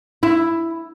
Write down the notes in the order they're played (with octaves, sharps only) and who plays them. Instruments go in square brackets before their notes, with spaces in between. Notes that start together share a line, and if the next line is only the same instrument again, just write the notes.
[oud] E4